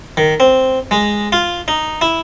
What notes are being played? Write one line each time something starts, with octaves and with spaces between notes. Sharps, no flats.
D#3
C4
G#3
F4
D#4
E4